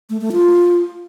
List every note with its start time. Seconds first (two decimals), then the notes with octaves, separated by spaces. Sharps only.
0.10 A3
0.21 A3
0.32 F4